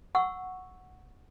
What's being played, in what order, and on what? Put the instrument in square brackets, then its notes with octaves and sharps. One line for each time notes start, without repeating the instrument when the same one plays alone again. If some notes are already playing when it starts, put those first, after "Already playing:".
[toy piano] F#5 C#6 E6